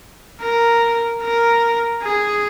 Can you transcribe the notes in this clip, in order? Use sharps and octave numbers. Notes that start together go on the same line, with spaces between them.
A#4
A#4
G#4